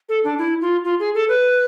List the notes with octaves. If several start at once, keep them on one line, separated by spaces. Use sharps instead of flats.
A4
D4
E4
F4
F4
G#4
A4
B4